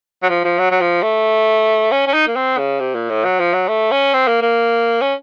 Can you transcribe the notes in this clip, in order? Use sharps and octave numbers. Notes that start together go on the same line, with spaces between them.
F#3
F3
F3
F#3
F#3
F3
A3
C#4
C#4
D#4
A#3
C4
C#3
C3
A#2
A2
F#3
F3
F#3
A3
C#4
C4
A#3
A#3
C#4